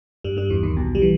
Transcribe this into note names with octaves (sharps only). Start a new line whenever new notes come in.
G2 G3
G2 G3
E2 E3
D#2 D#3
B1 B2
G3
E3